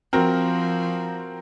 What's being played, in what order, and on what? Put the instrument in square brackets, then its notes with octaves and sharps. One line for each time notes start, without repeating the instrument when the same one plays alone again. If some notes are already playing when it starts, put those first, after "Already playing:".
[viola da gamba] F3 [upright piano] C4 F#4 A#4